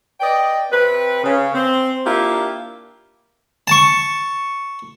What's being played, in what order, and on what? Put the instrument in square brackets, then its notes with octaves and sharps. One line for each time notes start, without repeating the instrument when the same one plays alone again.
[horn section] B4 D5 D#5 G5
C3 C4 B4
C#3
C4
A#3 D4 E4 F4 G4
[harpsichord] A5 C#6